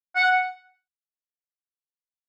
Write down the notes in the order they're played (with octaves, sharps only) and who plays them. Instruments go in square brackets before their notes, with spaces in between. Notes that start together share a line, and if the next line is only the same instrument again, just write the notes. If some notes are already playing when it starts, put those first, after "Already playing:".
[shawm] F#5